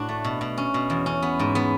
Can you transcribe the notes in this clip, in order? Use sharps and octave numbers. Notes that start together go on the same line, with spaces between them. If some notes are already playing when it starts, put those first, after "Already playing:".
Already playing: A2 D4 F#4
A3
B2
B2
C#4
B2
E2
C#4
B3
G#2
B3